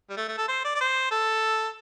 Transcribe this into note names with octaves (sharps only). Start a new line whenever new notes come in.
G3
A3
A3
A4
C5
D5
D5
C5
A4